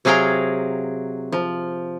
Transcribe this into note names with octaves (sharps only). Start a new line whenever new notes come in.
C3 F#3 G#4 F5 G5 A#5
F3